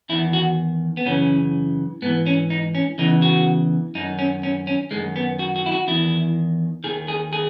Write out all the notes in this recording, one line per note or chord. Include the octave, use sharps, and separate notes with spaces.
E2 D#3 E4
F#4
B3
F#2 C#3 E3 C#4
G#2 E3 B3
C#4
D#4
C#4
E2 C#3 E3 D#4
F#4
F#2 D#3 D#4
C#4
C#4
C#4
F#2 D#3 G#3
B3
F#4
F#4
E4
F#4
E2 D#3 E4
D#2 D#3 G#4
G#4
G#4